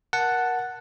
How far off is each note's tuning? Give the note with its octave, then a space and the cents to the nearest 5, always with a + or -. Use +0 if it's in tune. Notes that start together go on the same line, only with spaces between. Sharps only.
A#4 +20 F#5 +0 A5 +0